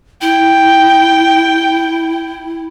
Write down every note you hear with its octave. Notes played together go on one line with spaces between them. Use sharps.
E4 G5